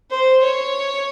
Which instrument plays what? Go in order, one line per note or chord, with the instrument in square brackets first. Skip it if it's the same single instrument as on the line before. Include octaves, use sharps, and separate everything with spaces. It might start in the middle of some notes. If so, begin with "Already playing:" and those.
[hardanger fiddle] C5
C#5